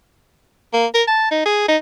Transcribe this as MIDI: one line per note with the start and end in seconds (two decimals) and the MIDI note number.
0.74 0.86 58
0.94 1.03 70
1.08 1.31 81
1.31 1.43 63
1.46 1.68 68
1.68 1.77 63